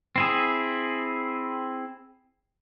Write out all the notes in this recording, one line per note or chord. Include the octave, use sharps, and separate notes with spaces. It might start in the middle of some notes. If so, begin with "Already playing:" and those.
C4 E4 G#4